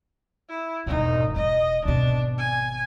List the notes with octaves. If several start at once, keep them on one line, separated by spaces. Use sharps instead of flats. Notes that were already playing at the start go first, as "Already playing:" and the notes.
E4
E1 G#2 D#4
E1 D#5
G#1 B2 D4
G#5